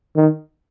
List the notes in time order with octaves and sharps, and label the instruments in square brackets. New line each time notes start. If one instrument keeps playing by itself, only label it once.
[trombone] D#3